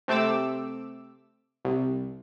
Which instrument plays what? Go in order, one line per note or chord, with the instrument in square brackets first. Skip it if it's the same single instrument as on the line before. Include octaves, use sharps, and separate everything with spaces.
[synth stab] C3 A3 C4 D6 E6
C2